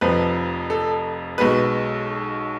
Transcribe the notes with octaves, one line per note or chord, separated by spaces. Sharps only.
F1 F2 F3 B4
A4
B1 B2 G#3 B4